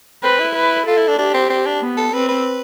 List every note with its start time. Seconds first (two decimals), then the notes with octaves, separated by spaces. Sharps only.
0.23 C4 B4
0.39 E4
0.55 B4
0.86 F4 A4
0.98 E4
1.08 D4
1.18 D4 G4
1.34 C4
1.50 C4
1.66 D4
1.82 B3
1.97 A4
2.13 C4 B4
2.29 B4